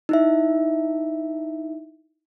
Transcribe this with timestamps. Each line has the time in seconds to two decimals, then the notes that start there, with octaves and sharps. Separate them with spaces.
0.09 D#4 E4 E5